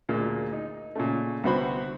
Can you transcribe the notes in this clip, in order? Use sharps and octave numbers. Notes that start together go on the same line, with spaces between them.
D2 A#2 G#3 A#3
D#4
A#2 C#3 A3
C2 D3 B3 F#4 C5 B5